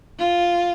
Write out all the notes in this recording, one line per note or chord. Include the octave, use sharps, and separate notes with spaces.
F4